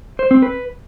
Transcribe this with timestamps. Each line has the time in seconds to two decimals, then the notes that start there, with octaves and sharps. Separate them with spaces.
0.19 C5
0.31 C4
0.42 B4